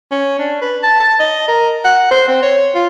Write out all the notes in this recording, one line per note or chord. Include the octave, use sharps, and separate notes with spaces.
C#4
D4
B4
A5
A5
D#5
A#4
F#5
C5
C4
C#5
F4